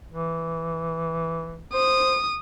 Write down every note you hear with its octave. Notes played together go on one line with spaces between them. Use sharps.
E3
C5 D#6